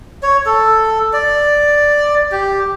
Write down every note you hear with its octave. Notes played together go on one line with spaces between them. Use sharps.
C#5
A4
D5
G4